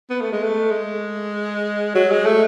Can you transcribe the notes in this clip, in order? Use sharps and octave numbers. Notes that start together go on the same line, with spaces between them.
B3
A3
G#3
A3
G#3
F#3
G#3
A3